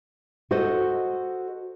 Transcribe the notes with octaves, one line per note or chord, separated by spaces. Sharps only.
F#4 A4 C5 D#5